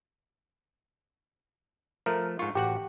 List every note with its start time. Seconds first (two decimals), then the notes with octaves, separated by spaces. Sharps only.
2.06 F3 A3 A#4
2.39 G#2 F4 C#6
2.55 A1 F#4 G4 F#5